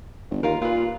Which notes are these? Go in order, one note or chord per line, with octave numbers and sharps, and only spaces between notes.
G1
D#2 F4 A#4
A#2 F4 B4